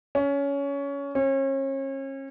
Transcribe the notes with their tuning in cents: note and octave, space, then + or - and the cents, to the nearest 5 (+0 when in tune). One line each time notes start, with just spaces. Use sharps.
C#4 +20
C#4 -35